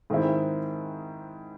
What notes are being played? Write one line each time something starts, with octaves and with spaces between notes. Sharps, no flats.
G#2 D#3 G#3 C4 E4